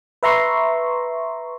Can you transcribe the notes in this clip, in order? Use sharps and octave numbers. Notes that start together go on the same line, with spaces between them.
B4 E5 A#5 C6 C#6